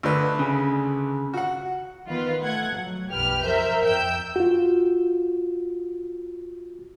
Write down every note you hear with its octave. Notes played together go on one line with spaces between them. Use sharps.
D2 D3 B4
C#3
F#4 F#5
D#3 B3 F4 B4
A3 F#5 G#6
F#3
B1 F2 G4 B4 F6
F2 A#4 C5 E5 G6
F2 G5 E6 G6
F4 F#4